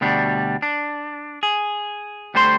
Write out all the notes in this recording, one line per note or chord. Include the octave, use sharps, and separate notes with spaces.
D2 B2 G3 D4
D4
G#4
D2 G3 A3 C5 D#5 C6